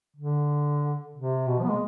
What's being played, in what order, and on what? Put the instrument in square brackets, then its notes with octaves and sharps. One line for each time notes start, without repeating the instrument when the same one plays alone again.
[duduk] D3
C3
B2
F3
B3
G#3